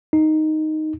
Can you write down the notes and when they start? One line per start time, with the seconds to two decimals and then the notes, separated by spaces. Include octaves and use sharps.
0.13 D#4